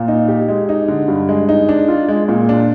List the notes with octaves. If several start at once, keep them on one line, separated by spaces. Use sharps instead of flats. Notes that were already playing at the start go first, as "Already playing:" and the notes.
Already playing: A#2
D#4
G4
G#3
D#4
D3
G2
G#3
D#4
D4
F4
G#3
A#2
D4